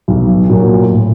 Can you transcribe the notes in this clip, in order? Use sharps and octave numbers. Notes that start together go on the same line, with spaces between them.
B1
A#2 F#3
A2